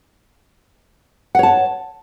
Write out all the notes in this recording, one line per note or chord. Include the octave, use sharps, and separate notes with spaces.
C#5 F#5 A5